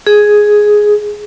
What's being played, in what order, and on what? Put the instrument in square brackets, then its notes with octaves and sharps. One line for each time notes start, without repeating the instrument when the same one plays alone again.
[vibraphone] G#4